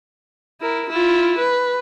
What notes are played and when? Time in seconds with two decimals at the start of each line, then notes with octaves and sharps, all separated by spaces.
0.61 E4 A#4
0.90 E4 F4
1.38 B4